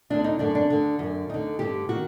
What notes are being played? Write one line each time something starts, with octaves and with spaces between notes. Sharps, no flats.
D2 D3 D4
D#4
F#2 D3 D4
D4
D2 D3
F#2 D3
D2 D3 D#4
G2 D3 G4
D#3 F#4